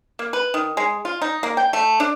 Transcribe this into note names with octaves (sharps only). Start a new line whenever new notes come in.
A#3
B4
D#3
G#3
F4
D#4
A#3
G5
A3
D4